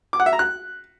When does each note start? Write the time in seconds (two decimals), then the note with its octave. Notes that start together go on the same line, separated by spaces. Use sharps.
0.13 D6
0.20 F#5
0.26 E5
0.33 A#5
0.39 F#6